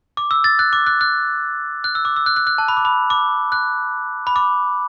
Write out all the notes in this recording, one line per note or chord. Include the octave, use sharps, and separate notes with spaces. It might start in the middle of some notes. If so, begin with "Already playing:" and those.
D6
E6
A6
F#6
D6
F#6
F#6
F#6
E6
D6
E6
F#6
F#6
F#6
A5
B5
D6
B5
D6
F#6
B5
D6